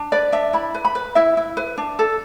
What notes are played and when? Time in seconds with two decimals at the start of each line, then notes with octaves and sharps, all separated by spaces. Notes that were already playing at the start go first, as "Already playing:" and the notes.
Already playing: D4
0.12 B4 D5
0.32 D4 E5
0.53 E4 B5
0.74 B4
0.85 B5
0.95 B4
1.15 E4 E5
1.37 E4
1.57 B4
1.78 D4
1.99 A4